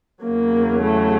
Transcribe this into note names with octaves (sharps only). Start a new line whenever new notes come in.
E2 C#3 F#3 A#3
A3